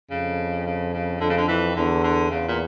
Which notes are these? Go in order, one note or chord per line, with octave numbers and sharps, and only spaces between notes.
F2 C#3
C#3
C#3
F2 D3
C#3
D3
E3
E2 D3
D3
E2 C#3
A#2